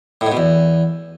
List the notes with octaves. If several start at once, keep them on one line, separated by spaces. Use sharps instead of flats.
A2
G#2
B2
E2